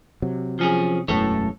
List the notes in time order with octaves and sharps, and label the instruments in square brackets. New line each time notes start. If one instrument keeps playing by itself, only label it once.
[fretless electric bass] C3 F#3
[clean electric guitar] F3 C#4 G#4
[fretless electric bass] E1 F#2 E3 [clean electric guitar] A3 A4 C#5